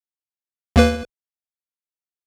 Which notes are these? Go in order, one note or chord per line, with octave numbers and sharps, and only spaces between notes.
D#2 A#3 B4